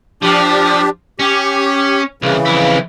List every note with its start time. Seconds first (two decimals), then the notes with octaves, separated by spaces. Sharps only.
0.23 F3 D4 G4
1.19 C#4 G4
2.22 C2 C#3 E3
2.46 F2 E4